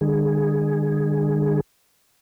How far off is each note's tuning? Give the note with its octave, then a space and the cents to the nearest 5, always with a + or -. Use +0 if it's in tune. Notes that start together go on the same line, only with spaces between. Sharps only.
D3 +40 G#3 -45 G#4 +0